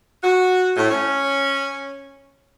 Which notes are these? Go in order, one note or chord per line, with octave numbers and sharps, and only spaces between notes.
F#4
A2
C#4